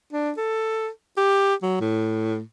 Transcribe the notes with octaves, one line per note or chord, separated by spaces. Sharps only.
D4
A4
G4
F#3
A2